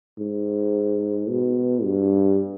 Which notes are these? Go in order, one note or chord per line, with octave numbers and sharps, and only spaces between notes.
G#2
B2
G2